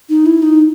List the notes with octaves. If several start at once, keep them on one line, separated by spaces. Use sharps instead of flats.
D#4
E4
D#4